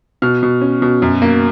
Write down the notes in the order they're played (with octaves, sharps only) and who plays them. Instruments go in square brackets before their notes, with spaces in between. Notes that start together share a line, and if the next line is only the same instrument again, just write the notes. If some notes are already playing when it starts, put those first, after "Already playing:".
[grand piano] B2 F6
B2
C#4
B2
F#2
A#3